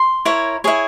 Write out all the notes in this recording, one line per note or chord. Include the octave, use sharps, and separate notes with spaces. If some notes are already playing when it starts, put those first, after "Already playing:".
Already playing: C6
E4 A#4 C#5
E4 G#4 C#5